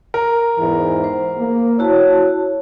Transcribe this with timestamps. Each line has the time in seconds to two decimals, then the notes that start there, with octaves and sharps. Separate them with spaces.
0.14 A#4
0.58 E2 G#2 E3
1.04 C5
1.38 A#3
1.79 E4 F#4 C#5 A5